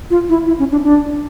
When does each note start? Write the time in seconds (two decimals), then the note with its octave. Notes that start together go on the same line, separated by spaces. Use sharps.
0.10 F4
0.29 E4
0.47 E4
0.59 C#4
0.71 D4
0.84 D4